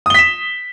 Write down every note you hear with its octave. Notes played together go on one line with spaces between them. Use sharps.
D#6 B6 E7 G7